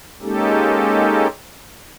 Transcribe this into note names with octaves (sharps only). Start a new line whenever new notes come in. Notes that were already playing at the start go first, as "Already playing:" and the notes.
G#3 A#3 C#4 D#4 G4 A4